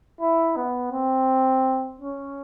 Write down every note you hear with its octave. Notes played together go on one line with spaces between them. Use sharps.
E4
B3
C4
C#4